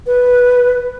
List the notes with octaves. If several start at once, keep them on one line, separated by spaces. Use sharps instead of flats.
B4